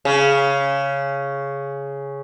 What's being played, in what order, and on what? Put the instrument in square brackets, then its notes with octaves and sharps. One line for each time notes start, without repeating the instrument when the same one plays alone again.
[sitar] C#3